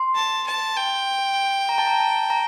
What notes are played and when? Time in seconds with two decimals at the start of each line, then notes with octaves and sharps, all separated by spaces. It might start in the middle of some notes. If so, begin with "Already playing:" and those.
Already playing: C6
0.15 A5
0.47 A5
0.77 G5
1.69 A#5
1.78 A5
1.87 A#5
2.00 A5
2.30 A#5